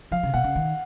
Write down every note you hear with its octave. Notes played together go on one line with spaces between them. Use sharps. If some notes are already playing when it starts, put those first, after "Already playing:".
F3 F5
C#3
B2 F#5
C#3
D#3